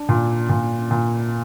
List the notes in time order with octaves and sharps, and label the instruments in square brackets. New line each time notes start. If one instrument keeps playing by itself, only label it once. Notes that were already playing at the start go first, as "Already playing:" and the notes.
Already playing: [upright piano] D4
A#2
A#2
A#2